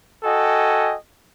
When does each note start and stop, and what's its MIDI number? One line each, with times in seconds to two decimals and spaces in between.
0.24 0.94 66
0.24 0.94 69
0.24 0.94 75
0.24 0.94 79
0.24 0.94 80